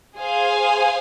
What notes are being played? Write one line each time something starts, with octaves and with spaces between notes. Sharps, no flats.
G#4 C5 F5 G#5